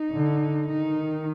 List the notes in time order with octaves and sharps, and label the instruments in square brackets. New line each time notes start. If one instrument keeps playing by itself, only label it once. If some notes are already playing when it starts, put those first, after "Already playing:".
Already playing: [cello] D#4
[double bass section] D3
[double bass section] D#3 [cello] D#4